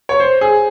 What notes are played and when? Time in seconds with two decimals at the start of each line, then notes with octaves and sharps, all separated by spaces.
0.09 C#5
0.20 C5
0.41 G#4